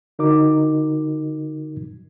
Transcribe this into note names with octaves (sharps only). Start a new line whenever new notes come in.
D3 D#4 F#4 A#4 D#5 D6